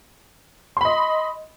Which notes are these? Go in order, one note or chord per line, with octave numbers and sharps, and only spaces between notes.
D#5 B5 C6